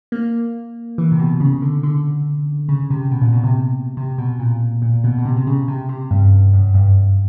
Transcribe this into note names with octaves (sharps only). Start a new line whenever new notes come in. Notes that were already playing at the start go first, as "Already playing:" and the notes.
A#3
E3
C3
B2
C#3
D3
D3
C#3
C3
B2
A#2
B2
C3
C3
B2
A#2
A#2
B2
B2
C3
C3
C#3
C3
C3
G2
F#2
G2